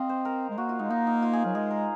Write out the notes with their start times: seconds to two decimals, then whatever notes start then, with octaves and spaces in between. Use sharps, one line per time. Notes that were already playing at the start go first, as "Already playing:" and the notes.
Already playing: C4 D#5 F5
0.09 C5
0.25 A#4
0.50 G#3
0.58 A#3 F#4
0.69 F4
0.79 G#3 D#4
0.90 A#3 D#4
1.07 D#4
1.22 F4
1.33 G#4
1.44 F#3 A#4
1.55 G#3 G#4
1.71 A#4